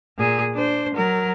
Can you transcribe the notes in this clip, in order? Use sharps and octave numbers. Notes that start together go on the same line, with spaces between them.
A#2 G#4
D4 C5
F#3 A#4